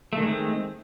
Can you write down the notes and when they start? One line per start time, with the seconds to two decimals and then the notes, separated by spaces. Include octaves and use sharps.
0.13 A3
0.17 D#3
0.22 G#3
0.27 C4